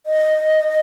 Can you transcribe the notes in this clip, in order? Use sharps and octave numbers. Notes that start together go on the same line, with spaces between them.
D#5